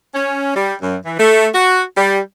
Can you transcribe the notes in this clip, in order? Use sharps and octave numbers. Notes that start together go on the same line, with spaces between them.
C#4
G3
F#2
E3
A3
F#4
G3